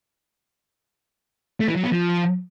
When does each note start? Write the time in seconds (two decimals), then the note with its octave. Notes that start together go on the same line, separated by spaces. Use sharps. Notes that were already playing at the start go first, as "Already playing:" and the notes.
1.60 A3
1.68 E3
1.76 F#3
1.84 B3
1.92 F3